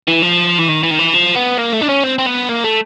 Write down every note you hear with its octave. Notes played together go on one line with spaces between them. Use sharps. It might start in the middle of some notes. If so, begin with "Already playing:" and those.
E3
F3
E3
D#3
E3
D#3
E3
F3
B3
A#3
A3
D4
C#4
C4
C4
B3
A#3
A3